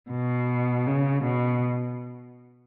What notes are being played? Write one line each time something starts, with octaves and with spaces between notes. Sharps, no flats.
B2
C#3
B2